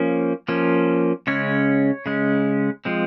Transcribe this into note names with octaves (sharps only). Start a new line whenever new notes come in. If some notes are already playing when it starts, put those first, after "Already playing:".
Already playing: F3 A#3 C#4
F3 A#3 C#4
C#3 G#3 C#4 C#5
C#3 G#3 C#4
F3 G#3 C4